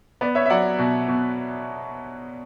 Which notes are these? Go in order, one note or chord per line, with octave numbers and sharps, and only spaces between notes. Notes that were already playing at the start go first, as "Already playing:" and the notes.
B3 D5
C#5 E5
E5
F#3 D5 F#5
B2
B2